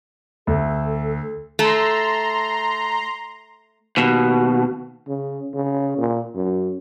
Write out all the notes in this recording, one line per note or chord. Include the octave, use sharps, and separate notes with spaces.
D2 A4
A3 A#5 C6
D#2 B2
C#3
C#3
A#2
F#2